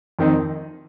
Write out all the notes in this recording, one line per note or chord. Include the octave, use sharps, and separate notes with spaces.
F2 D#3 C4 D#4